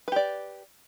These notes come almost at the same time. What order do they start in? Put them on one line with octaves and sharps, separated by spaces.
B4 G4 D5